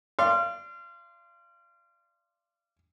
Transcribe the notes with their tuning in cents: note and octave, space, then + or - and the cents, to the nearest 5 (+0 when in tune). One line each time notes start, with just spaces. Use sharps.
D5 +10 F5 -30 C6 +0